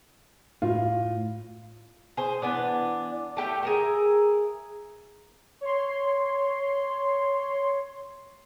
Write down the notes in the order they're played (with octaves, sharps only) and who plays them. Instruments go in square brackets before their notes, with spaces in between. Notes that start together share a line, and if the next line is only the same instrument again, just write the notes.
[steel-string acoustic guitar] A2 [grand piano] F4
[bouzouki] G#4 C5
E3 B3 D4
A3 G4 F#5 G5
G#4 A#4 E5
[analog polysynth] C#5 C6